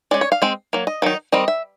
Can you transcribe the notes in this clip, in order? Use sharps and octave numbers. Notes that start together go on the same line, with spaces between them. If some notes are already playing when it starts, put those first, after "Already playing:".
G#3 C#4 D5
C#5
F5
G#3 C4
F#3 A#3
D#5
D#3 F#3 D#4
D#3 G3 C4 D#5
E5